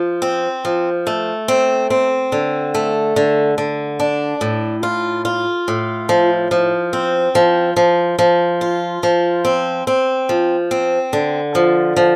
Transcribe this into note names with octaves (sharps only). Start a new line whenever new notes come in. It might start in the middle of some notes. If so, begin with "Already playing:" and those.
Already playing: F3
C4
F3
A3
C4
C4
D3
A3
D3
D3
D4
A2
F4
F4
A2
F3
F3
C4
F3
F3
F3
F4
F3
C4
C4
F3
C4
D3
F3
F3